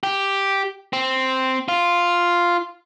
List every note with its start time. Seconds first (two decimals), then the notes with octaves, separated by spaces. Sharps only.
0.03 G4
0.93 C4
1.68 F4